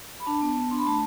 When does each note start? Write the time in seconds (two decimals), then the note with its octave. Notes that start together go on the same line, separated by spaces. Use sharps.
0.20 B5
0.26 D4 A5
0.42 B3
0.56 B3
0.71 D4 C6
0.78 B5
0.86 A3 A5